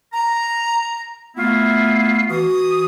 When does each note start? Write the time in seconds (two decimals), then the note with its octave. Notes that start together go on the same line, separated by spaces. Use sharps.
0.13 A#5
1.36 A3 B3 E4 F4
2.30 E3 F#4 D#6